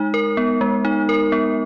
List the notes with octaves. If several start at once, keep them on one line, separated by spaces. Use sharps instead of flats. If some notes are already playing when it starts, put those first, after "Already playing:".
Already playing: G#3 D#4
A#4
B3
G#3
D#4
A#4
B3